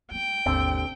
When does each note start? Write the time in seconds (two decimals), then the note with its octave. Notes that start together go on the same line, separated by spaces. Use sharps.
0.11 G3 B3 G5
0.46 G#1 D#2 B2 D3 C4